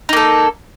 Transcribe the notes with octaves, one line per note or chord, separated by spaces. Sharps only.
A#3 D#4 A4